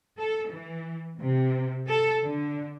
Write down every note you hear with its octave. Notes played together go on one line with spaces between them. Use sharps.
A4
E3
C3
A4
D3